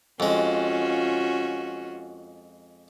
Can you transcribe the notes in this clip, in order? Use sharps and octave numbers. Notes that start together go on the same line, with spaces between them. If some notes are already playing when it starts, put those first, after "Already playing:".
F2 G#3 C#4 F4 F#4